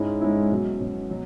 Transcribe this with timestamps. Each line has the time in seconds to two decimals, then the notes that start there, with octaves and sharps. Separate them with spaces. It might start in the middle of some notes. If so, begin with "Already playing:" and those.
Already playing: G#2 G#3 C#4 E4
0.21 G#2 G#3 C#4 E4
0.50 B2 F#3 C#4
0.80 B2 F#3 C#4
1.10 B2 F#3